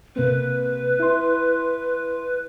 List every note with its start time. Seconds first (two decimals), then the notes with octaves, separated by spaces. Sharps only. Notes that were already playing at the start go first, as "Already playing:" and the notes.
0.16 C3 A#3 C4 B4
0.99 E4 C6